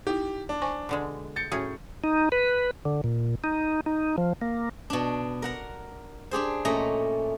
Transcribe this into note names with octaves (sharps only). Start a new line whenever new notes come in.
D#4 E4 G4
D4
C5 G#5 C#6
B2 D3 G#3
G6 A6 C#7
A2 C#4 F#4 G#4
D#4
B4
D3
A#2
D#4
D#4
F3
A#3
B2 D4
A#4 F#5 A#5
D4 G4 G#4 C5
A#2 A3 C#4 D#5 A#5